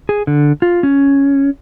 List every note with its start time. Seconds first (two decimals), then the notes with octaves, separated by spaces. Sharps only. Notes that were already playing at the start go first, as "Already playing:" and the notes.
0.09 G#4
0.27 D3
0.62 F4
0.83 C#4